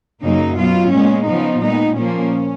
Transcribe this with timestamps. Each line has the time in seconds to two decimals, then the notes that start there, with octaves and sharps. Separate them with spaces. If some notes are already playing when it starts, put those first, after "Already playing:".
0.22 F#2 C#3 F#3 A#3 D#4
0.57 B2 F#3 B3 F4
0.92 A#2 G#3 B3 C#4
1.27 C#3 F3 B3 D#4
1.62 A#2 G#3 B3 D#4
1.96 A#2 F3 A#3 C#4